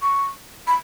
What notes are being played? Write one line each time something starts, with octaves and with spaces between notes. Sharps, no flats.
C#6
B5